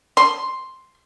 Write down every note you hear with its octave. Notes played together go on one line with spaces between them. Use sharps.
C6